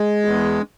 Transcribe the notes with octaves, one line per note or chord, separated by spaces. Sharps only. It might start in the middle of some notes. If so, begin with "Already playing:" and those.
Already playing: G#3
E2